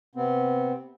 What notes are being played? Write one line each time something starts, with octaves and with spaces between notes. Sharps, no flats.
C3 B3 C4